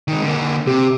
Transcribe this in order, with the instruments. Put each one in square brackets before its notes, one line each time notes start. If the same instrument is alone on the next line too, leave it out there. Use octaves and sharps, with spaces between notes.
[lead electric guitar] D#3 G#3
D3 A#3
[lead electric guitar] C3 [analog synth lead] G4